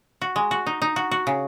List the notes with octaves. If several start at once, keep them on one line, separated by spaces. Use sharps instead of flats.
F#4
G#3
F#4
D#4
D#4
F#4
F#4
C#3